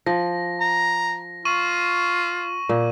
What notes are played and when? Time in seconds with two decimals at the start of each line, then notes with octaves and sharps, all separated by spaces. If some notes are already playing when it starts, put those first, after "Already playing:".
0.06 F3 A#6
0.60 A#5
1.45 F4 C#6 D#7 F#7
2.69 A#2